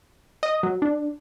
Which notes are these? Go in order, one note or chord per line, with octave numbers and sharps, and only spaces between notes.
D#5
F#3
D4